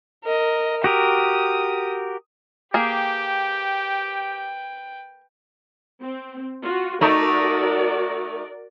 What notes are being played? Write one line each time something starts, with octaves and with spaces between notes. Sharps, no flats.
A#4 D#5
F#4 G4 A#4 D#6
A#3 G4 G#4 B4 G5
C4
F4 F#4
A3 D#4 F#4 A#4 D5